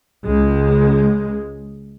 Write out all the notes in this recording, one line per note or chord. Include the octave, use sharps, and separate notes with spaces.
C#2 G#3